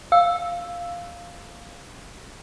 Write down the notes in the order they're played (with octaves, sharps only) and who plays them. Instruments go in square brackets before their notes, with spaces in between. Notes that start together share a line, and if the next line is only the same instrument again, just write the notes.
[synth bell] F5 E6